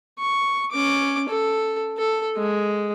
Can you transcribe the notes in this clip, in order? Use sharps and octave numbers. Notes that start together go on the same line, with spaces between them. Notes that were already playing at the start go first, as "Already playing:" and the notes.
C#6
C#4 D6
A4
A4
G#3